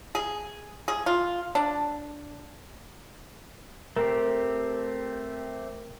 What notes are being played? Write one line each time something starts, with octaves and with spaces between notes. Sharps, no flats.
G#4
G#4
F4
D4
A3 C4 G4 A#4